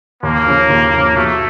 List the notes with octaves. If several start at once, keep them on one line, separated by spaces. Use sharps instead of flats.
D#2 A#3
C#3 F3
D#2
C#3 F3
B2 A3